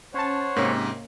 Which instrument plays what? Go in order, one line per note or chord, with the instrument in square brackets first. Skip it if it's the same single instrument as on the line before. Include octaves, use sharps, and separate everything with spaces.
[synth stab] C#4 A5 [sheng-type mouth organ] C5 C#5 F#5
[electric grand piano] G#2 C3 [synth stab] A#3 C#4